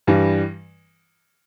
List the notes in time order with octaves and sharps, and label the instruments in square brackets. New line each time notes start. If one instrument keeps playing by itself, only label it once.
[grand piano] G2 E3 G3